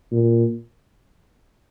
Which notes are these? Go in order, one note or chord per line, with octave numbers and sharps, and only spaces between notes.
A#2